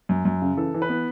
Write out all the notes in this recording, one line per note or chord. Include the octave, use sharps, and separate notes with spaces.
F#2
F#2
C#3
E3 A4
E3
B4
B3